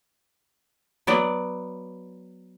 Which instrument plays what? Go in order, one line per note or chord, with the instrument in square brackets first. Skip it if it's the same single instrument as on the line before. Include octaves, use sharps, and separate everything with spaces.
[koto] F#3 B3 D5